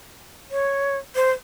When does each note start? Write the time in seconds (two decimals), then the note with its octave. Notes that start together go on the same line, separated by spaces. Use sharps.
0.51 C#5
1.15 C5